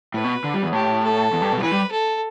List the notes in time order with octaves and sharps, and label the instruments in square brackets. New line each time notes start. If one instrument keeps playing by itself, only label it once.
[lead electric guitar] A2 [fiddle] B4
[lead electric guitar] B2
D3
G3
E2
[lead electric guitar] A2 [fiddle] G4
[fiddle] A4
[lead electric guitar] E2
G2
B2
G3
[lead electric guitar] E3 [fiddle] B4
[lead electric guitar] G3
[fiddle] A4